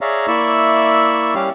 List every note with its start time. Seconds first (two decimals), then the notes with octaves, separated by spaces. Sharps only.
0.01 G#4 C#5 D5 E5 F5 A#5
0.28 A#3 E4 D5 E5 C#6 E6
1.35 G3 C#4 G4 F5